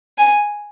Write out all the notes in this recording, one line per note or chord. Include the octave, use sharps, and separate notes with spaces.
G#5